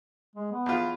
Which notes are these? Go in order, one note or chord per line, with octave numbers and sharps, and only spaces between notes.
G#3
B3
E2 F4